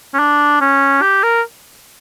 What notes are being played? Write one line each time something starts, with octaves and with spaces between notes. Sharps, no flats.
C#4
D4
C#4
G4
A#4